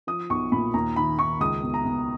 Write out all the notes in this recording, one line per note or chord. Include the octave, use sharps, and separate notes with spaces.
F3 D#6
B1 C#6
A#2 B5
D#2 A#5
D#3 B5
D#3 C#6
C#2 D#6
B2
A#5
B2